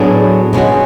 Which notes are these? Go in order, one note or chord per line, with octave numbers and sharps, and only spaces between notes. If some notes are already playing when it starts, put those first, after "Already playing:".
Already playing: A2 F#3 B3 D4 G#4
B2 G#3 C#4 F#4